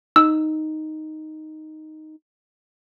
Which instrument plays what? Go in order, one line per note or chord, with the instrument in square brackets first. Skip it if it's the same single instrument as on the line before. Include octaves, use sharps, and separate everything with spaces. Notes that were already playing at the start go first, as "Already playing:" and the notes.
[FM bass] D#4 [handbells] E6